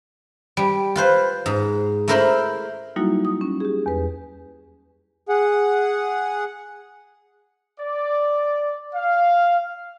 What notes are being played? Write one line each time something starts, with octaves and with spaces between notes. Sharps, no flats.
G3
F4 B4 C5
G#2
A3 E4 A#4 C5 B5 C6
F#3 G3 A#3 D#4 E4 F#4
D#6
C#4
G4 G#4
E2 B4
G#4 F#5
D5
F5